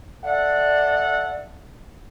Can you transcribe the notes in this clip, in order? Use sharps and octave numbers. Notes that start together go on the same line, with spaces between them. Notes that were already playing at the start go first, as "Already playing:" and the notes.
A4 D5 E5 F#5